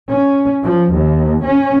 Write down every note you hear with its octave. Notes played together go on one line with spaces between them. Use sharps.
C#4
F3
D#2
C#4